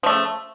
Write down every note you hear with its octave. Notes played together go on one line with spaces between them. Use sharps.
C#3 F3 A3